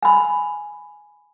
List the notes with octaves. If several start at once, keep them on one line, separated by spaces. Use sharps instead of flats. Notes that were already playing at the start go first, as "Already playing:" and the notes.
G#5 B5